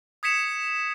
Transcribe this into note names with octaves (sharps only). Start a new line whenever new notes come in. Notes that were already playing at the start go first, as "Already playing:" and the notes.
D#6 G#6 B6 C#7 E7 F7